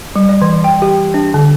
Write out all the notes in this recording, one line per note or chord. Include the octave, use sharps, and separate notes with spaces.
G3
D5
E3
G5
G4
D4
D3